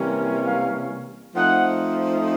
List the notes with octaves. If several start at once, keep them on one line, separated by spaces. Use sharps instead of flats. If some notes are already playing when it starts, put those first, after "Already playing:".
Already playing: C3 E3 G3 A#3 C#4
F5
F3 A3 C4 D#4 F#5